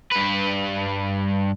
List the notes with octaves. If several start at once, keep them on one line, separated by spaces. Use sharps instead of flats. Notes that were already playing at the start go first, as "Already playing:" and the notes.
G2 B4